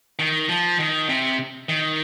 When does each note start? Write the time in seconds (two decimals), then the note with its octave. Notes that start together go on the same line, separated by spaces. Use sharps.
0.19 D#3
0.49 F3
0.79 D#3
1.09 C3
1.69 D#3